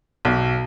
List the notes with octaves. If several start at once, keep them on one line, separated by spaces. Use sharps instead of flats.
B1